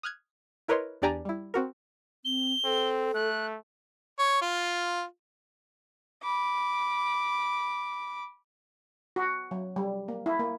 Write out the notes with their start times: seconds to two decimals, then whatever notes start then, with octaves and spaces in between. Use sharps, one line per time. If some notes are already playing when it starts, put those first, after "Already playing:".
0.03 D#6 F6 F#6 G#6
0.68 E4 A#4 B4 C#5 D#5 C6
1.02 E2 D4 G4 D5 G#5 A#5
1.25 G3 E4
1.54 C4 F#4 A#4
2.25 C4 G7
2.64 C4 A4
3.14 A3 F#6
4.19 C#5
4.41 F4
6.23 B5 D6
9.16 F#4
9.51 F#3
9.76 G3
10.08 A#3
10.26 E4
10.40 A#3